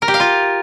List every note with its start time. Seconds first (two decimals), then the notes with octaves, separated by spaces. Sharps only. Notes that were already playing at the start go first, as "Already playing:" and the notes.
0.02 A#4
0.08 G4
0.14 F5
0.20 F4